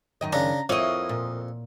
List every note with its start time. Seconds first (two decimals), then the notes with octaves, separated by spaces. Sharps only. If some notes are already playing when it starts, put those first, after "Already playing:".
0.21 F#2 D#3 D#5
0.33 C#3 D4 A#5
0.69 F2 A#3 E4 C#5 D#5
1.09 A#2